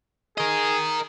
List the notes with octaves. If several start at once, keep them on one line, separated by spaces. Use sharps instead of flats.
G#4 A#4 D#5